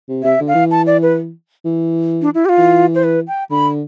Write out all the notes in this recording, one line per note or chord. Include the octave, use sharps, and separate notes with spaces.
C3
C3 E5
D3
F5
E3
A5
D5
B4
E3
D4
E4
G4
F4
E3
C5
B4
G5
D3 B5